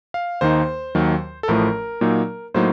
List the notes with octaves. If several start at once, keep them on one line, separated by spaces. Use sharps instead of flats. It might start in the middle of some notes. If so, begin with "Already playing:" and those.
F5
D#2 D#3 A#3 D#4 C5
D#2 D#3 F#3
A4
A1 A2 F3 A3 A#4
A#2 F#3 A#3 D#4
A2 F#3 A#3 D#4 C5